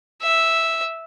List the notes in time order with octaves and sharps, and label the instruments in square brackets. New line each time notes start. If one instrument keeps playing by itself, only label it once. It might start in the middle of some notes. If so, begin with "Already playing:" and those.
[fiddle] E5